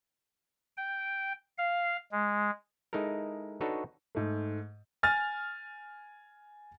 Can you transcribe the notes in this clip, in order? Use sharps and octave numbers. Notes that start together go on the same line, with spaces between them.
G5
F5
G#3
G#3 D#4 E4 A4 A#4
D4 D#4 F#4 A4 B4 C#5
G#2 A3
G#5 F6 A6